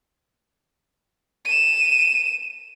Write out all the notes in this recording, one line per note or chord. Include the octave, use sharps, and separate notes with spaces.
D#7 E7